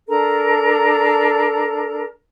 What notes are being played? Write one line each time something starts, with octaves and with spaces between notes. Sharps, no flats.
D4 A4 A#4 A#5